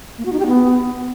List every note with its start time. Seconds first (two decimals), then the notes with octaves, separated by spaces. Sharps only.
0.18 A#3
0.25 F#4
0.32 D#4
0.40 G4
0.47 B3